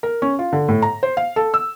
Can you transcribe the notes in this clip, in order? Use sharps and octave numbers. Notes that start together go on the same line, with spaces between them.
A#4
C#4
F4
D3
A2
A#5
C5
F5
A4
E6